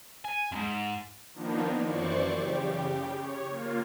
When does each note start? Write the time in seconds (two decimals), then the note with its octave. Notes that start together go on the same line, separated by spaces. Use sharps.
0.25 G#5
0.52 F2 G#2
1.34 D#3 F3 A#3 B3 D4 D#4
1.83 F#2 E3 C5 D5 C#6
2.35 C#3 G4
3.18 C#5
3.49 A#3 F4